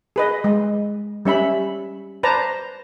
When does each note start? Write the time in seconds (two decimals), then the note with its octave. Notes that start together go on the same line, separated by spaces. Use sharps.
0.16 G#4 B4 D#5
0.44 G#3
1.25 G3 C#4 E5 B5
2.23 B4 C5 D5 A5 A#5